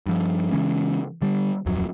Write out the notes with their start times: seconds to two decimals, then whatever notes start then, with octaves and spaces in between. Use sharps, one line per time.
0.06 G2 F3
0.52 C#3 E3 G#3 C#4
1.22 D3 G3
1.66 D1 F2 F#3